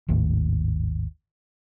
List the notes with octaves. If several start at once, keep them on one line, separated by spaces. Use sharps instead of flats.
G#1 D#2 A2